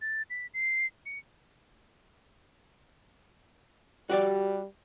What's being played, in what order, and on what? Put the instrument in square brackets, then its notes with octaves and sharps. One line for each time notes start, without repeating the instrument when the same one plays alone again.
[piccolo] A6
B6
C7
C#7
[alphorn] G3 [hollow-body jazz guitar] F#4 G4 D5